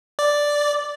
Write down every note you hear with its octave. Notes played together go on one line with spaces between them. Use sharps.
D5